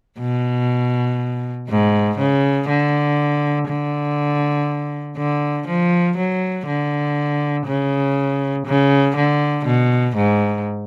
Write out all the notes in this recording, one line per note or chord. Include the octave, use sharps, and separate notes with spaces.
B2
G#2
C#3
D3
D3
D3
F3
F#3
D3
C#3
C#3
D3
B2
G#2